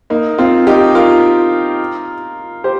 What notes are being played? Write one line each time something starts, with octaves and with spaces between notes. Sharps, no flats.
A#3 D#4
C4 F4
D#4 G4
F4 A#4
G4 C5